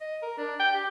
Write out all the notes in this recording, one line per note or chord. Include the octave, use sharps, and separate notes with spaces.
D#5
A#4
D4
G5
G4